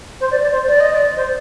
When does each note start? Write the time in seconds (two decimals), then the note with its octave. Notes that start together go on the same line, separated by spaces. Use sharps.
0.21 C5
0.31 D5
0.42 D5
0.52 C5
0.68 D5
0.81 D#5
0.93 D5
1.16 C5